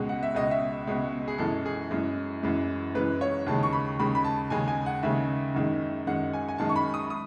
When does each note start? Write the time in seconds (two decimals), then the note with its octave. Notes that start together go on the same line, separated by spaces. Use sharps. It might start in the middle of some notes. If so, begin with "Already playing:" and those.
Already playing: C#2 B2 G#3
0.09 F#5
0.23 E5
0.35 C#2 B2 G#3 D#5
0.51 E5
0.87 C#2 B2 G#3
1.28 G#4
1.38 F#2 E3 G#3 A4
1.65 G#4
1.91 F#2 E3 G#3
2.43 F#2 E3 G#3
2.95 F#2 E3 G#3 B4
3.21 C#5
3.47 D#2 C#3 G#3 A5
3.63 C#6
3.73 B5
3.99 D#2 C#3 G#3 B5
4.15 B5
4.24 A5
4.50 D#2 C#3 G#3 G#5
4.68 G#5
4.86 F#5
5.03 D#2 C#3 G#3 E5
5.54 F#2 D#3 G#3
6.07 F#2 D#3 G#3 F#5
6.33 G#5
6.49 G#5
6.58 F#2 D#3 G#3 A5
6.69 C#6
6.76 B5
6.94 D#6
7.10 D#6